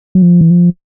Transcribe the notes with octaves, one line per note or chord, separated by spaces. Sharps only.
F#3
F3
E3
F3